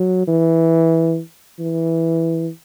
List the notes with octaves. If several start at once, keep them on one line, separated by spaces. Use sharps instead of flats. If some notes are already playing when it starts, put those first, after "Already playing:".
Already playing: F#3
E3
E3